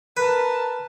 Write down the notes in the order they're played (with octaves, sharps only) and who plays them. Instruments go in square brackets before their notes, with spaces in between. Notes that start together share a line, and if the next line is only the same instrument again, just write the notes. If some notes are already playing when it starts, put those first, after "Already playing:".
[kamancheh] A#4 A5 [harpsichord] B4